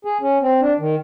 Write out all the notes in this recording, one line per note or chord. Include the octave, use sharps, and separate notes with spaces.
G#4
C#4
C4
D4
D#3